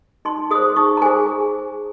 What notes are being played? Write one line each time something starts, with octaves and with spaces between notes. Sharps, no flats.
D#4 C6
G#4 C5 D#6
D#4 C#6
A#5
G#4 C5 G#5